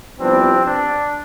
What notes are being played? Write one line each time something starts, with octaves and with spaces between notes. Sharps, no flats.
C2 C3 F3 B3 C4 D4
D4